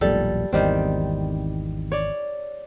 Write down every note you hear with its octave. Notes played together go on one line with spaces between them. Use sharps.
E1 B1 A#2 G3 A4
G#1 E2 D#3 G3 C4
C#5 D5